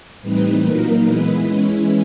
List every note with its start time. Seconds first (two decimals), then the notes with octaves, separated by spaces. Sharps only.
0.22 A2 E3 G3 C4 D#4 B4
0.63 A#2 F#3 A#3 D#4 A#4
1.04 E3 G#3 B3 E4 B4
1.45 E3 G#3 C#4 E4